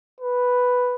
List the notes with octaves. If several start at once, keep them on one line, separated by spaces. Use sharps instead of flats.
B4